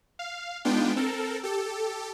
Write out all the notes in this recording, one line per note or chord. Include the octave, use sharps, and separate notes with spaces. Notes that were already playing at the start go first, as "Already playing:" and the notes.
F5
G#3 B3 D4 D#4 F4 G5
C4 A4 A#4
G4 A4